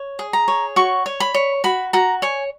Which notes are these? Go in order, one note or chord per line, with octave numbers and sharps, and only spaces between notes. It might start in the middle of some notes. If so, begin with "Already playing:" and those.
Already playing: C#5
G#4
A#5
C#5
F#4 C#6
C#5
B5
C#5
F#4 B5
F#4 A#5
C#5 G#5